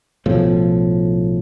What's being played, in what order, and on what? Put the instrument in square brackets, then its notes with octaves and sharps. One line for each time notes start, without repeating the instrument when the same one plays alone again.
[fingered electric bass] B1 A2 F3